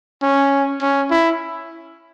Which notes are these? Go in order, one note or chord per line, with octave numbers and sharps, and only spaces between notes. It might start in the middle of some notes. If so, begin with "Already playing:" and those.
C#4
C#4
E4